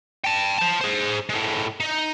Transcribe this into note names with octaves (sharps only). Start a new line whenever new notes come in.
G5 A5
C5 A5
G#4 C5
A2 G#3
D#4